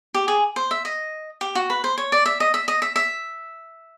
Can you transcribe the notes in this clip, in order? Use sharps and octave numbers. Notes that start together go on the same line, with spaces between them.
G4
G#4
C5
E5
D#5
G4
F#4
B4
C5
C#5
D5
E5
D#5
E5
D#5
E5
E5